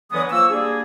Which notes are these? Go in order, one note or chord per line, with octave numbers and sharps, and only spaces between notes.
D3 E3 F#3 G#3 B3 D#6
F3 A#3 C#6 E6
G3 A#3 D4 G#4